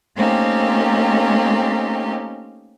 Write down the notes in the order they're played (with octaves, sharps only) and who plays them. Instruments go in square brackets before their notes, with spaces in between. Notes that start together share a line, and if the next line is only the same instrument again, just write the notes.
[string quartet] A3 A#3 C4 C#4 D#4 G4